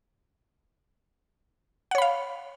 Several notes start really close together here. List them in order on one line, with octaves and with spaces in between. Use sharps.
F#5 C#5 B5 F5